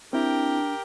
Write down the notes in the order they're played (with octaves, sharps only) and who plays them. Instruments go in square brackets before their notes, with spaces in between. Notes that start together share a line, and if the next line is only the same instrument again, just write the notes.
[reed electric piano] C4 E4 [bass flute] D4 [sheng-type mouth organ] G4 A#4 G5